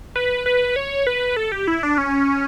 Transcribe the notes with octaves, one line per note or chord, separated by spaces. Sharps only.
B4
B4
C#5
B4
A4
G4
E4
D4
C#4